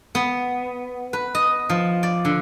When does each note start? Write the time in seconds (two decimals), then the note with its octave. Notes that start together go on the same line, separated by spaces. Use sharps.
0.15 B3
1.13 B4
1.35 D#5
1.70 F3
2.03 D5
2.25 D3